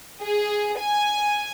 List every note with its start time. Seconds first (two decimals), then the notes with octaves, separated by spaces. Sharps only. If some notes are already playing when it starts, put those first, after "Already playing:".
0.22 G#4
0.79 G#5